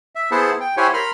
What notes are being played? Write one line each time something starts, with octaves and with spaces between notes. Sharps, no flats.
E5
B3 E4 G#4 C5 F#5 A5
G5
E4 G4 C5 C#5 F#5 G#5
A#4 B5 C6 F6